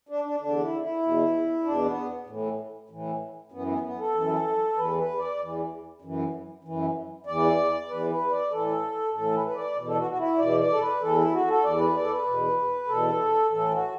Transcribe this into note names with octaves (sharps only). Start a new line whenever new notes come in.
D4
D4
E2 D3 D4
E4
E4
E2 B2
E2 B2 D4
B3
A2 E3
A2 E3
F#2 E3 B3
B3
B3
A4
F#2 E3
E2 E3 B4
B4
D5
E2 E3
F#2 E3
F#2 E3
E2 E3 D5
E2 E3 B4
B4
D5
A2 E3 A4
A2 E3 A4
B4
B4
D5
E2 B2
A4
F#4
F#4
E4
E2 B2 D5
D5
A4
B4
E2 E3 A4
E4
F#4
A4
E2 E3 D5
B4
D5
A4
B4
E2 B2
E2 B2 A4
A2 E3 A4
F#4